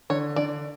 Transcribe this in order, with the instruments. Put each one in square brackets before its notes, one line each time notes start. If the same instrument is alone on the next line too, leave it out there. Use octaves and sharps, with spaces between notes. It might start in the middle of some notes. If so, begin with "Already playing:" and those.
[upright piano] D3 [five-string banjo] C#5
[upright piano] D3 [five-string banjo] D5